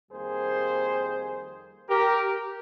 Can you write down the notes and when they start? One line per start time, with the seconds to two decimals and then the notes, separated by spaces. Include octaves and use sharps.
0.10 F2 D#3 G3 A#3 G#4 C5
1.89 G4 A#4